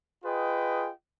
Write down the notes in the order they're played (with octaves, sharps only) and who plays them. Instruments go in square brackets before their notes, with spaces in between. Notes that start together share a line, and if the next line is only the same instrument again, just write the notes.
[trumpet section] F4 G#4 B4 D#5 G5